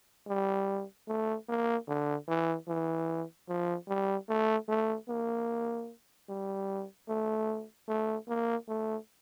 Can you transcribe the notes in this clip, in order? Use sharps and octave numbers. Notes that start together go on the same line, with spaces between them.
G3
A3
A#3
D3
E3
E3
F3
G3
A3
A3
A#3
G3
A3
A3
A#3
A3